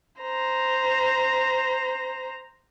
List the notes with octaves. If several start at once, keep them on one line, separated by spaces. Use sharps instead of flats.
C5 A#5